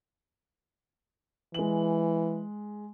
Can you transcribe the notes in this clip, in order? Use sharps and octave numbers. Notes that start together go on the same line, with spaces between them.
E3 G#3 F#7